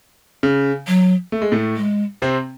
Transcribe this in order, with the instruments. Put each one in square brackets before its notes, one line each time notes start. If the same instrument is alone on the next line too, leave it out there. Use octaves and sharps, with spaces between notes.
[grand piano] C#3
[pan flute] F#3
[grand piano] A3
G#3
A2 A3
[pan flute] G#3
[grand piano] C3 C4